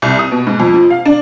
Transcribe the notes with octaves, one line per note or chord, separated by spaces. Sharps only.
C2
D#6
B2
G#2
F2
F3
F5
D4